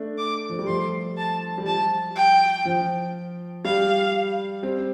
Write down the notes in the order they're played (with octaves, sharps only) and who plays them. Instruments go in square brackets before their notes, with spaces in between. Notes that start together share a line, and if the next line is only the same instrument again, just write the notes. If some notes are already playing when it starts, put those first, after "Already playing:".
Already playing: [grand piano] A3 D4
[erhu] D6
[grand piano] F3
G3
[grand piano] F3 A3 [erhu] C6
[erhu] A5
[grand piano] G3
[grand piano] F3 [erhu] A5
[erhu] G5
[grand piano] F3
[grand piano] G3 [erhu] F5
[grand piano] G3 C4